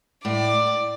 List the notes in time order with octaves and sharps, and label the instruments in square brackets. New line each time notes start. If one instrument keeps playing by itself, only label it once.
[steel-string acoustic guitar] A2 [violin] D5